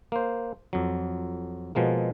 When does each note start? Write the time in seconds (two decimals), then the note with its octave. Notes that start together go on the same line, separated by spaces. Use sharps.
0.12 A#3 C5
0.73 F2 F#3
1.75 B2 F3 G#3 A#3